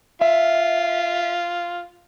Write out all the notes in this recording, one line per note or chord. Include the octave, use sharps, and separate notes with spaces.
F4 E5